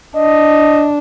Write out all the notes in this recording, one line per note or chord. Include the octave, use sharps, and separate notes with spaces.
D4 D#5